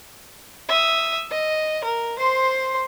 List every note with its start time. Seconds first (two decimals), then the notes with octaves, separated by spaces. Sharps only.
0.69 E5 D#6
1.31 D#5
1.84 A#4
2.18 C5 C6